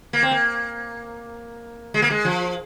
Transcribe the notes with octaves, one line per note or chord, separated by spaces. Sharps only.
A#3
C4
A#3
G#3
A#3
G#3
F3